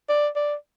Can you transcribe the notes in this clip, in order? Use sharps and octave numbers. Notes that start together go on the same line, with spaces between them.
D5
D5